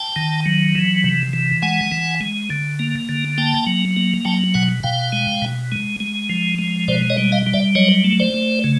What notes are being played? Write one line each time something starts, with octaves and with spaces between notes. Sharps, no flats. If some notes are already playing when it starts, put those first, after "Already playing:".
Already playing: G5 A5
D#3
F#3
E3
C3
E3
G#3 F#5 G#5
E3
G#3
D3
A#3
D3
A#3 G5 A5
F#3
A#3
F#3 G5 A5
B2 F#5 G#5
B2 F5 G5
G#3
B2
G#3
G#3
F3
G#3
B2 C5 D5
C#5 D#5
G3
D#5 F5
G3
D5 E5
F#3 C#5 D#5
A3
C5 D5
A3
C#3